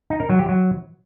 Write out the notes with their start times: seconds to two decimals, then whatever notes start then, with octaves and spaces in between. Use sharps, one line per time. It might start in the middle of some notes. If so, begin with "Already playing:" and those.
0.10 D#4
0.20 A#4
0.29 F#3
0.39 G4
0.49 F#3